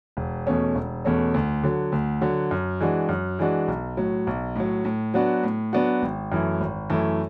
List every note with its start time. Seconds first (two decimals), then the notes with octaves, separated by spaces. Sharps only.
0.17 E1
0.47 E2 B2 A3 C#4
0.75 E1
1.05 E2 B2 A3 C#4
1.34 D2
1.63 D3 F#3
1.92 D2
2.21 D3 F#3
2.51 F#2
2.81 E3 G#3 D4 F#4
3.09 F#2
3.39 E3 G#3 D4 F#4
3.68 B1
3.97 A2 F#3
4.27 B1
4.56 A2 F#3
4.85 A2
5.14 F#3 B3 D4 F#4
5.43 A2
5.73 F#3 B3 D4 F#4
6.02 G#1
6.32 F#2 E3 A3 E4
6.60 G#1
6.89 F#2 E3 A3 E4